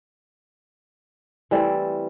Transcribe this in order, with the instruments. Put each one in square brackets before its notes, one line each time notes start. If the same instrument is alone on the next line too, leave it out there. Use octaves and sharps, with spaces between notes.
[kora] E3 G3 A3 C4